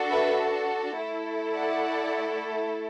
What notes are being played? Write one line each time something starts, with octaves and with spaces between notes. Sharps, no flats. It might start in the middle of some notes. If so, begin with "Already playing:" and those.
Already playing: D4 F#4 A4
B4 E5
A3 E4 A4
D5 F#5